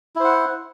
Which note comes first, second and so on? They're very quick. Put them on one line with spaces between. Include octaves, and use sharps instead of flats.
E4 C5 F#5